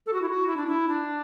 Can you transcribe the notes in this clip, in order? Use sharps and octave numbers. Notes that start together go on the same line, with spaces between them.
A4
F#4
E4
F#4
E4
D4
E4
D4